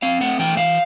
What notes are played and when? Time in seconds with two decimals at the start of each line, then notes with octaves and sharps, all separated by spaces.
0.02 C4 F5
0.21 A3 F#5
0.39 E3 G5
0.57 E3 F5